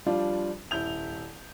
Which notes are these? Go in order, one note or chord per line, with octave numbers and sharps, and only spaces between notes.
F3 G3 D4 F4
D#1 E4 G6 F7